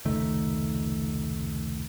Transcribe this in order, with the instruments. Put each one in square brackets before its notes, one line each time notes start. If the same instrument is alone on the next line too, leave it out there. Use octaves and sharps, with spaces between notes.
[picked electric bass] F1 C#2 D#3 A3